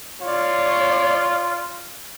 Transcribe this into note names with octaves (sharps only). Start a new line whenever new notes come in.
F4 C#5 D5